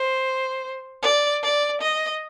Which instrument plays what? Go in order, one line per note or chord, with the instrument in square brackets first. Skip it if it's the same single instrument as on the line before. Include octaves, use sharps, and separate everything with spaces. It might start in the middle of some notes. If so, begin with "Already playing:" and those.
Already playing: [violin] C5
D5
D5
D#5